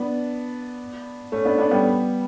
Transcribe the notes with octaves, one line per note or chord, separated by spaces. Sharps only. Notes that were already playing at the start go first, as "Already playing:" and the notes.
Already playing: B3 D4
A3 C#4
B3 D4
B3 D4
G3 B3